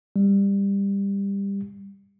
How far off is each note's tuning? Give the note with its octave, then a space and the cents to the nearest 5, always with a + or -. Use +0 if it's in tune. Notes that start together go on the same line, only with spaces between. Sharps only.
G3 +20